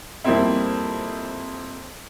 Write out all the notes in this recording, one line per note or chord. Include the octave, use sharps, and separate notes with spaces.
F2 G3 A#3 C4 E4